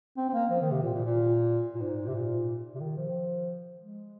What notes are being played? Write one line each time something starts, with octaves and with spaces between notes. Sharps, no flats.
C4
C4
A#3
F3
D#3
C3
A#2
A#2
A#2
A#2
G#2
C3
A#2
C3
D#3
F3
G#3